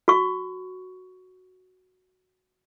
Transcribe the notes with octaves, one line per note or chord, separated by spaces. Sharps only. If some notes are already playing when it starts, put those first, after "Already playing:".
F#4 C#6